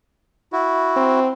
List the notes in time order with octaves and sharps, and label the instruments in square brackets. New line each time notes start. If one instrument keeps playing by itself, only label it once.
[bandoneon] E4 F#4
[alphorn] C4